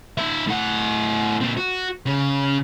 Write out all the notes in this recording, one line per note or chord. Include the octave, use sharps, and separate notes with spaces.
D#4 E5
A2 F#5
A#2 C4
F#4
C#3